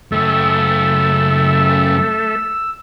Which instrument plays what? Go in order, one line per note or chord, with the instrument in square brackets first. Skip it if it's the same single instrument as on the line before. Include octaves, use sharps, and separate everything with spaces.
[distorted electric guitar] F#2 C#3 [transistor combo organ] A3 A4 E5 [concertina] E6